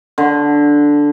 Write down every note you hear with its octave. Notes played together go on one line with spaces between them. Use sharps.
D3